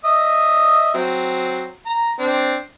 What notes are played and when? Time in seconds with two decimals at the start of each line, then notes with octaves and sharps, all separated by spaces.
0.05 D#5 E5 D#6
0.94 F#3 C4
1.86 A#5
2.19 C4 D4